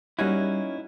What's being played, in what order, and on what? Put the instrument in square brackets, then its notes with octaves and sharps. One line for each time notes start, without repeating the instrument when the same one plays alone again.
[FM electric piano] G3 G#6 [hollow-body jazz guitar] A#3 D#4 E4 [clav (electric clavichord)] C#4 F#4